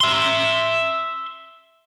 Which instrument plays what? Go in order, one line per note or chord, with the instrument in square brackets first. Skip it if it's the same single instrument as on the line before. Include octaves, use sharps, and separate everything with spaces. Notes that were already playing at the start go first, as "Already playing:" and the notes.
[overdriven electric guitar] E5 C6